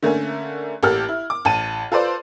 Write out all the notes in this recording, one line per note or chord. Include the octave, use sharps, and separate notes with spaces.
D3 A3 A#3 C#4
A1 A#3 G4 A4 F6
E4
D6
A1 A5 D#7
F4 A4 B4 C5 D5